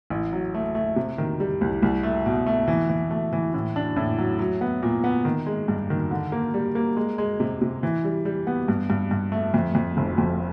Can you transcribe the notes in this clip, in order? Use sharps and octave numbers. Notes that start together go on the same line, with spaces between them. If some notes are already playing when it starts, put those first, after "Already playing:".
A1
F#3
A3
A3
C3
D#3
G3
C2
C2
A3
B2
A3
E3
E3
A3
E3
A2
D4
A2
F#3
F#3
B3
A#2
B3
D#3
G#3
G2
D#3
D3
A#3
G3
A#3
G#3
G#3
C3
C3
E3
G3
G3
B3
G2
G2
G2
A3
F2
F2
F1
F2